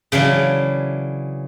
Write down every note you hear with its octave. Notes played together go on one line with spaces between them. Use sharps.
C#3 E3 F#3 D4